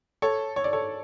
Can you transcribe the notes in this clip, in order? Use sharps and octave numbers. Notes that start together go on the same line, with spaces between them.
A4 C#5
C#5
D5
A4 C#5